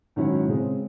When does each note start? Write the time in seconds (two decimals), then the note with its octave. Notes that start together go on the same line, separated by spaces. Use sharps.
0.16 G#2 D#3 F#3 C#4 E4
0.48 C#3 G#3 C4